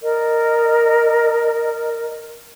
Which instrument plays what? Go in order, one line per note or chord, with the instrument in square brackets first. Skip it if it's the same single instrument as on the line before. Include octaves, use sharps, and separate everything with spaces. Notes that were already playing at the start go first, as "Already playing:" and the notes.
[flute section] A#4 D5 D#5